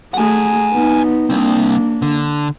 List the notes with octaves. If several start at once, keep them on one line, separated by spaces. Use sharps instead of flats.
A3 G#4 F#5 G#5
B3 D#4
G3 A#3 C4 D4
D3